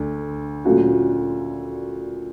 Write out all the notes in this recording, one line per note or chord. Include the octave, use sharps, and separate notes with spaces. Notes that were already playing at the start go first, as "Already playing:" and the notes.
Already playing: D2 D3
A#2 F#3 A3 C#4 F#4